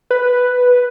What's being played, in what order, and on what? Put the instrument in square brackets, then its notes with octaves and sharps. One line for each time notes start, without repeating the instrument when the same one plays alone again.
[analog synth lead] B4